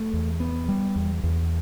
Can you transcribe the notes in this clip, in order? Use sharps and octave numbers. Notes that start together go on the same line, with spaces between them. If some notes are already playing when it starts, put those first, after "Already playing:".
Already playing: A3
E2
B3
G3
E2
E2